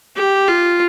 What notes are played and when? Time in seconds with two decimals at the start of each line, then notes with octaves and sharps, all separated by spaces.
0.16 G4
0.48 F4